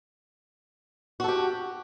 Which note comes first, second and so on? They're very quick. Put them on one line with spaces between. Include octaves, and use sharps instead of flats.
F#4 A4 G4